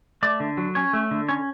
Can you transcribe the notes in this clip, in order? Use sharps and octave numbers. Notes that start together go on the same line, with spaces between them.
A3 D5
D3
F#3
C#4 C#5
A3
D3
C#4 C#5